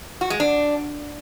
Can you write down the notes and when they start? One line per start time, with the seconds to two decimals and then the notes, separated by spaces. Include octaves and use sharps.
0.21 F#4
0.30 G#3
0.40 D4